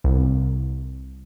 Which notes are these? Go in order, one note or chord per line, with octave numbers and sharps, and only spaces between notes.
C2